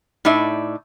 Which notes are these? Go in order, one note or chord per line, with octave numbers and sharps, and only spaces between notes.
A2 D#4 D5 E5